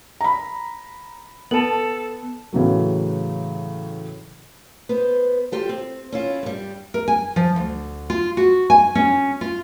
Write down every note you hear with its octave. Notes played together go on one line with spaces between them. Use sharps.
A#5 B5
B3 A4 A5 F#7
A2 C#3 E3 F#3
B3 B4 C5
F4 G4 A4
C4
C#4 E4 F4
G2 G3
A#4
G#5
F3
D2
F4
F#4
G#5
C#4
F4